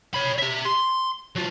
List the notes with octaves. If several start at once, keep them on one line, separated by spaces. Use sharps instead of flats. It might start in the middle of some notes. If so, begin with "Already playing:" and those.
C#5 B5
G4 E5
C6
F#3 F4